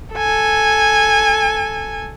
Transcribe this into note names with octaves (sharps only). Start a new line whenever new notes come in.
A4 G#5